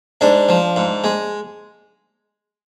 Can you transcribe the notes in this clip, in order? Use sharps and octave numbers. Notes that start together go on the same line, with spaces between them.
G#2 D4
F3
G#2
G#3